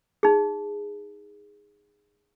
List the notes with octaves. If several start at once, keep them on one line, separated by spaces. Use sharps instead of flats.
D#4 G#4